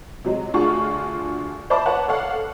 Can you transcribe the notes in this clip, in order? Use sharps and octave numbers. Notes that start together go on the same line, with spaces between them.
C3 F#3 G#3
D2 D4 F4 F#4 G#4 C#6
C5 D5 E5 A5 B5 D6
B4 C#5 F#5 A5
A4 C#5 F5 F#5